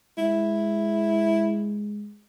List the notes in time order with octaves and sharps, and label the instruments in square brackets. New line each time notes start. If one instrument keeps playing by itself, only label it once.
[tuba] G#3 [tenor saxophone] E4